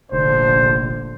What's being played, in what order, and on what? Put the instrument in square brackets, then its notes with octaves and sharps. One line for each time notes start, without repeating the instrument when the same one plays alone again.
[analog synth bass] F1 [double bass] A#1 D3 [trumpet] C5